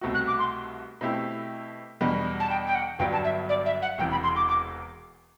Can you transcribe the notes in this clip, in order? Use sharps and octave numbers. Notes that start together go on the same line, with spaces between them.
C2 B2 A3 C4 F#4
F#6
D6
C6
B2 A3 C4 E4 G4
E2 B2 G3 D4
A5
G5
G5
F#5
G1 G2 F#3 B3 D4 G5
A5
E5
D5
E5
F#5
E1 E2 C3 E3 G5
B5
C6
D6
D6